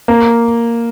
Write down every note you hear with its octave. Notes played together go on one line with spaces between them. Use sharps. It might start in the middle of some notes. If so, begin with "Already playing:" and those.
A#3